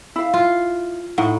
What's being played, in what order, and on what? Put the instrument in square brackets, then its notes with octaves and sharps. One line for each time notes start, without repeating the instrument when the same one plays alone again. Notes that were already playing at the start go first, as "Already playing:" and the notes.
[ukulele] E4 F5
[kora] F4
[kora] A2 [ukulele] D#4 F#5